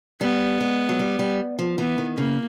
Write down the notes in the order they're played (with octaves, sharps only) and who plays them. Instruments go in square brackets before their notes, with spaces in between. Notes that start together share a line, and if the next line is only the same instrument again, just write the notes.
[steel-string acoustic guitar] G3 [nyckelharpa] B3
[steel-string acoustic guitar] G#3
F#3
G3
G3
F3
[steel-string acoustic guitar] E3 [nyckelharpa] B3
[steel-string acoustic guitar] D#3
[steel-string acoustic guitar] C#3 [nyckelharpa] A#3